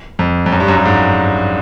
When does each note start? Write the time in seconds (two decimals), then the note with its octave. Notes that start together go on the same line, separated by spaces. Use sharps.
0.19 F2
0.46 F2
0.52 F#2
0.60 G2
0.68 F#2
0.77 G2
0.85 G#2